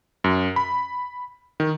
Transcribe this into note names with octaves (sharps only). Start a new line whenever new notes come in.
F#2
B5
D#3